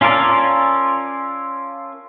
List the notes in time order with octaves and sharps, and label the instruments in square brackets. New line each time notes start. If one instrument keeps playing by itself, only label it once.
[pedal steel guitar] C#4 F4 A4 A#4 D5